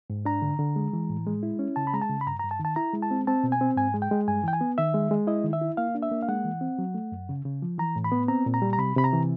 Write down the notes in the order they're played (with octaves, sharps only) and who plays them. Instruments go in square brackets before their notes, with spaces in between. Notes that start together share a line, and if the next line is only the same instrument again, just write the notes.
[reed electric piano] G#2
D4 A#5
D3
D3
G#3
E3
A2
G#3
E4
C#4
C#3 A5
B5
G#3 A#5
A5
C#3
B5
G2 A#5
A#5
G2
A5
D#3
A5
E4 A#5
G#3
A5
C4
C4 A5
B2
G#5
C4
G#2 G#5
G#3
G5
G#3
G2 G#5
E3 G5
G#5
B3
D#3 E5
G#3
G#3
E4 D#5
D#3
E5
E4
A#3 F5
D4
E5
A#3
F5
G#3 F#5
E3
C4
F#3
A3
F#2
C#3
C#3
F3
E3 A#5
A2
B5
B3
C4 A#5
A#2
A#5
G3
A#5
C3 B5
C3 B5
A#5
E3